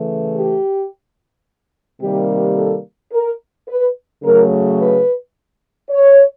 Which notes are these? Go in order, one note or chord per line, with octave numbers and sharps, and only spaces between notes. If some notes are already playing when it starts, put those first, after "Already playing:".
Already playing: C#3 E3 A3
G4
C3 D#3 G3 A#3 G4
A4
A#4
B4
C#3 F#3 A3 A#4
B4
C#5